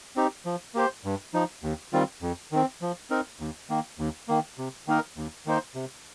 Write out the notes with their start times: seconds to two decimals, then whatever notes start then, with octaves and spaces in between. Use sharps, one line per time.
0.16 C4 D#4 G4
0.45 F3
0.75 A#3 G4 C5
1.05 G2
1.34 F3 D#4
1.63 D#2
1.93 D#3 G3 C4 F4
2.22 F2
2.52 D#3 C4
2.82 F3
3.10 C4 D#4 A#4
3.40 D#2
3.69 D#3 A#3
3.99 D#2
4.28 D#3 A#3
4.58 C3
4.87 D#3 A#3 D#4 A#4
5.17 D#2
5.46 D#3 A#3 D#4 C5
5.75 C3